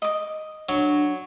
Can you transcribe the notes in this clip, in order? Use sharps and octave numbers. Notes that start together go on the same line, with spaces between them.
D#5 D6
F#3 D4